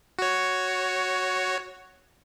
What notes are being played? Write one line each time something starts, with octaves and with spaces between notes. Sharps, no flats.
F#4 C#5